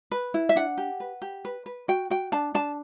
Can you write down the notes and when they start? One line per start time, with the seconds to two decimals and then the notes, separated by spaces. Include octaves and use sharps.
0.11 B4
0.34 E4
0.49 E5
0.56 D4 F#5
0.78 G4
1.00 B4
1.22 G4
1.45 B4
1.66 B4
1.88 F#4 G5
2.10 F#4 G5
2.32 D4 A5
2.54 D4 A5